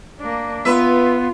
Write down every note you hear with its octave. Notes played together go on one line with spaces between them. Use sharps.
A#3 D4
B3 F4 B4 E5